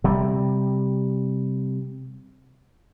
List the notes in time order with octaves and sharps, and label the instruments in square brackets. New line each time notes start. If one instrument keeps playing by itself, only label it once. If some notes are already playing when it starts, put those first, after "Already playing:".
[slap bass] C3 G3